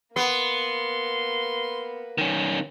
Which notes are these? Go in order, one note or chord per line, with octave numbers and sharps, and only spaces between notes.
A#3 B3 B4 C6
D#3 C#4